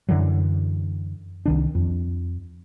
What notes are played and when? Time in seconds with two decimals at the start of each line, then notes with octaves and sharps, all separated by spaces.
0.09 F#2 D3 E3 F#3
1.46 C2 D#3 D4
1.75 F2